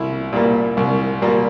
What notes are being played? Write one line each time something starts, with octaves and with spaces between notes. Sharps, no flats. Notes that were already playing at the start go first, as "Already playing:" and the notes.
Already playing: C2 E4
A#2 G3 A#3
C2
A#2 G3 A#3